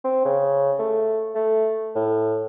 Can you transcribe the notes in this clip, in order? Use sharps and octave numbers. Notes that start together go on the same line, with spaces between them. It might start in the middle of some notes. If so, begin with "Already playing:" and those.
C4
C#3
A3
A3
A2